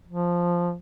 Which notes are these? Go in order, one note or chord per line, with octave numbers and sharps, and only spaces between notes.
F3